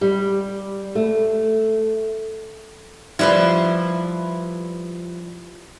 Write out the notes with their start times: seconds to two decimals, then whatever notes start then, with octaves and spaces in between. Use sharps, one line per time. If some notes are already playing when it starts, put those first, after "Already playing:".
0.01 G3
0.95 A3
3.19 F3 G3 E4 B4 C6